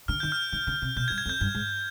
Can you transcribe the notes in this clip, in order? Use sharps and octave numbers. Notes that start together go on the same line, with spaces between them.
D3 F6
D#3 G6
F6
D#3
D3
C3
B2 G6
G2 G#6
G#6
F2
G6
G2
G#2